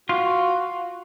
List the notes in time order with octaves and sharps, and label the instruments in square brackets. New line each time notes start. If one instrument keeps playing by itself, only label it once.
[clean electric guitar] F4 [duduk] F#4